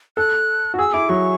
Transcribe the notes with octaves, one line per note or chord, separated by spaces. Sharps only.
A4 F#6
F#4
G#4 E6
E4 D6
F#3 C#6